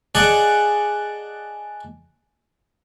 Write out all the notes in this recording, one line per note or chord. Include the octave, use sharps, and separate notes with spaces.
G#4 D5 D#5 F#5 A5